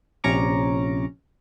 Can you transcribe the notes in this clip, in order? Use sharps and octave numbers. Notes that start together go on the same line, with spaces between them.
A#1 C3 C#4 A#5 C#6 D6